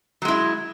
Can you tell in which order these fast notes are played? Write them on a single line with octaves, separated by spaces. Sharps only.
F#3 G#3 E4